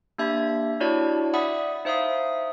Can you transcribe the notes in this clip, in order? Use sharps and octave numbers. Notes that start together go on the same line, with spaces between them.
A#3 D4 G4 E5 B5 G#6
D4 E4 F#4 C#5 D5 A5
D5 E5 F#5 B5 D#6
D#4 C5 E5 F5 D#6